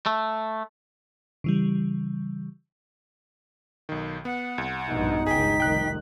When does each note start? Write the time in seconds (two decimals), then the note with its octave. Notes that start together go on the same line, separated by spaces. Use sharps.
0.06 A3
1.44 C#3 E3 G3
3.89 B1 D#3
4.25 B3 F#5
4.58 C2
4.88 A#1 G2 B2 D#4
5.27 G1 C#2 G#4 G5 B6
5.60 F1 C2 D#3 G5 F#6